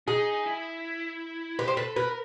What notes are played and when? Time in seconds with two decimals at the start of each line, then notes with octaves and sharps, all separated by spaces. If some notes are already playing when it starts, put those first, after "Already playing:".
0.07 D#4 G#4
0.46 E4
1.59 G4 B4
1.68 C5
1.77 A4 B4
1.96 A#4 B4